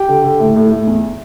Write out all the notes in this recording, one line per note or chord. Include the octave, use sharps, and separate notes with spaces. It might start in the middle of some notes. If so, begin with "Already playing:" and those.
Already playing: G4 G5
D3
D3
A2
A2
A2
E2